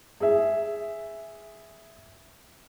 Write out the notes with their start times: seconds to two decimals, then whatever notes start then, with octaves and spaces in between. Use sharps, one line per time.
0.20 G#4 E5